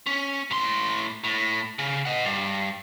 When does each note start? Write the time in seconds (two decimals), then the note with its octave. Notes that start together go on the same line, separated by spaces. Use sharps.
0.07 C#4
0.51 A2 C6
1.24 A2
1.79 C#3
2.05 D#5 F#5
2.24 G2